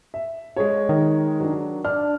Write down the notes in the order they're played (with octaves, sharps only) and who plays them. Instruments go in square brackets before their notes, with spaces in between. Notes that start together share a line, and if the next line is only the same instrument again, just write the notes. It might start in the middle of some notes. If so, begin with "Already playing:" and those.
[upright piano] E5
G#3 G#4 C#5
[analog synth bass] D#3
[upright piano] F#3 D4
[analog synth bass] D4 [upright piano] F6